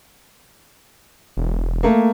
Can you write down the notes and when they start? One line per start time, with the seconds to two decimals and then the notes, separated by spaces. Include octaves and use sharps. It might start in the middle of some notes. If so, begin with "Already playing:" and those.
1.37 E1
1.83 A3 A#3